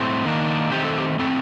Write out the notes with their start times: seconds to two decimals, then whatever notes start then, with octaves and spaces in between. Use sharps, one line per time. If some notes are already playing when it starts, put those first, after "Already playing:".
Already playing: A2 A3 C4
0.25 D#3 A#3 D4
0.72 D#3 A3 C4 G4
0.85 A4
0.98 G4
1.19 A2 A3 C4 A4